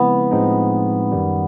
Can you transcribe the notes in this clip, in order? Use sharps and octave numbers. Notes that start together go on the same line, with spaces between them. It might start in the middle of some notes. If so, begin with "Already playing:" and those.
Already playing: C#3 F3 G#3 B3 C4 E4
A2 F3 G#3 C4 D#4
F#2 D#3 G3